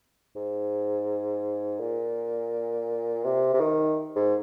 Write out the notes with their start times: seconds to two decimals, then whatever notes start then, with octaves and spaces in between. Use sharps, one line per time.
0.36 G#2
1.80 A#2
3.24 C3
3.53 C3
3.60 D#3
4.16 G#2